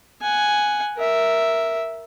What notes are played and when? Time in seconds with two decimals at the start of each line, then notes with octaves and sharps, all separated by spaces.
0.22 F#5 G#5
0.97 A#4 E5